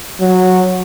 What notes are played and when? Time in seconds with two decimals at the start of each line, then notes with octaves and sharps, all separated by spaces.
0.21 F#3